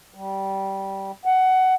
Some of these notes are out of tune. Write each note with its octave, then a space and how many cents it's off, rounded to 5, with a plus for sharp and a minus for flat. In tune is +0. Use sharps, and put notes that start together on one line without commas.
G3 -15
F#5 +15